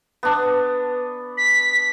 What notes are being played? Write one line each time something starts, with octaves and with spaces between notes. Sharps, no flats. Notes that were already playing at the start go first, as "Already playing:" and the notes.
B3 D4
B6